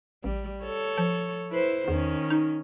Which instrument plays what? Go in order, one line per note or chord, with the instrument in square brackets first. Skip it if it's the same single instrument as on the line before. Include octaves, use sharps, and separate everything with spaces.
[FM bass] A1 [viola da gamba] G3
[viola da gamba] A4 C#5
[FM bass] F3
[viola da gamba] E4 B4 C5
[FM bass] E2 [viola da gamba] D#3 C#4
[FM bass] D#4